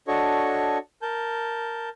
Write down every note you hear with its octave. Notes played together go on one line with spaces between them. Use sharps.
D4 F#4 A4 C#5 D#5 C#6
A#4 A5 G6